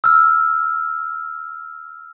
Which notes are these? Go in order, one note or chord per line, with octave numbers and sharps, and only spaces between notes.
E6 F6